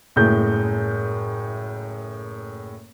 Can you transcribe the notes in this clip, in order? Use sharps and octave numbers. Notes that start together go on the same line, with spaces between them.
F#1 A2 G#3 G6